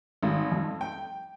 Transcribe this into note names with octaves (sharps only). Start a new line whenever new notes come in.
G#1
F2
G5